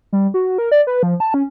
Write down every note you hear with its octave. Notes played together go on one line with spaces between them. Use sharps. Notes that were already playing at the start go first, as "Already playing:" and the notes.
G3
F#4
A#4
D5
B4
F3
A5
C#4